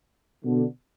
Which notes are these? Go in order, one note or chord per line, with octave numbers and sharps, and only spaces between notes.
B2 D3